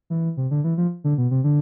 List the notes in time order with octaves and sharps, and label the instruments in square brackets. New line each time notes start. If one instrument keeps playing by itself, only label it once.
[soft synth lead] E3
C3
D3
E3
F3
D3
B2
C3
D3